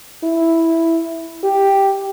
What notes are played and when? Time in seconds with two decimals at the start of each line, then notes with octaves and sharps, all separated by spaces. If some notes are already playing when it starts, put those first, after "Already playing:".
0.24 E4
1.44 G4